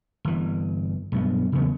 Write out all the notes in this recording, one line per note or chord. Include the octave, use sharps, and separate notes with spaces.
G1 E3
B1 G2 B3
F#1 E2 C#3 B3